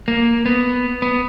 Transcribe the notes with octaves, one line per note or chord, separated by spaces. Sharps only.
A#3
B3
B3